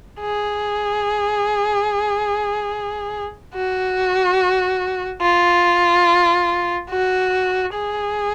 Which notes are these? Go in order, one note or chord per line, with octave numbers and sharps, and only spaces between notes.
G#4
F#4
F4
F#4
G#4